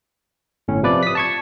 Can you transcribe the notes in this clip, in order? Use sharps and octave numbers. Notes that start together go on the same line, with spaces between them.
G1 A2 C#4
C3 F3 B4 D5
D#6 B6
A5 C#6 G#6